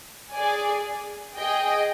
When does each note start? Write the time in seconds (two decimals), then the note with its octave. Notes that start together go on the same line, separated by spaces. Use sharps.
0.33 G#4 D5 G#5
1.36 G#4 D#5 G5